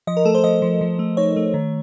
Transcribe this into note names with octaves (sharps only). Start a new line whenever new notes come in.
F3 D#5
A#4
A3 A4
C5
F3 D#5
F3
F3
A3
D#4 C#5
A3
D#3